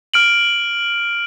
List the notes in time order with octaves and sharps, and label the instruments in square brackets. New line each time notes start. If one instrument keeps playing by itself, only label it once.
[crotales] F6 D7 F#7